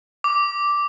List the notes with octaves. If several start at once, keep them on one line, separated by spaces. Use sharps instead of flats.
D6